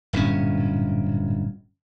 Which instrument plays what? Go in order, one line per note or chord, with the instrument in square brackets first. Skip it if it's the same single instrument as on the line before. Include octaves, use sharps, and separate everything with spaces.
[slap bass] D1 G2 A#2 C#4